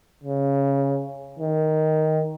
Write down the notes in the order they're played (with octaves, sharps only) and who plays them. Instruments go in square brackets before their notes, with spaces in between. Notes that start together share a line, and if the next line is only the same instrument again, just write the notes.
[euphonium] C#3
D#3